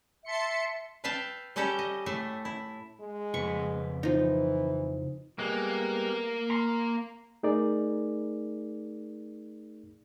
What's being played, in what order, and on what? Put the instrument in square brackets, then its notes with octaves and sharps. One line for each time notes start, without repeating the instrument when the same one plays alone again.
[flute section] E5 [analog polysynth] A5 C6 C#7
[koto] B4 E5 F5 G5 A5
G3 C#4 G4 A4 G5 A#5
D#5
A2 A3 E5
E4
[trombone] G#3
[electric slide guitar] F2 C#3 B4 [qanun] C#6
[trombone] E3 [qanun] F3 D#4
[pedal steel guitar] G3 G#3 B3 [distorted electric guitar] A#3
[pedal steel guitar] A#5 C6
[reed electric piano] A3 D#4 G#4 A#4 D5